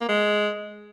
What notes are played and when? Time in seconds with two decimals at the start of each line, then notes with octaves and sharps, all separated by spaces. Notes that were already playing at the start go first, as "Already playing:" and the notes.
0.01 A#3
0.09 G#3